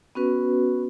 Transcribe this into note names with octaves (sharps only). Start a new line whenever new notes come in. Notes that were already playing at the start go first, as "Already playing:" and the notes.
B3 C#4 F#4 B4